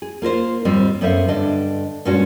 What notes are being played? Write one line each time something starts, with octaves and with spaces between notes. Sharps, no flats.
G#4
A#3 F4 A#4 C5
D#2 G#2 G3 C4 D#5
F#2 B3 A4 C5 E5 F5
G2 D3 D4 D#5
G2 A#2 G#3 C#4 D4 F#4